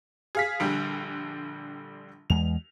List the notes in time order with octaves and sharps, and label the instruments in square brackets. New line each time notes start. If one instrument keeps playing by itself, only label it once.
[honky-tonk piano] G#4 F5 B6
A#1 D3 G3
[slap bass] E2 G#3 [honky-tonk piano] F7